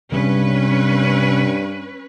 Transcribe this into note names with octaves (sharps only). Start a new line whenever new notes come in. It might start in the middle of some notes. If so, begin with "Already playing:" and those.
G2 C3 G3 G#3 C#4 B4